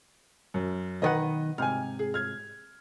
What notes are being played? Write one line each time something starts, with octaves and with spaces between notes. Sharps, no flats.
F#2
B1 D#3 B4 D#5 F#5
G#2 C3 G#5 F6
G#4
F6 G#6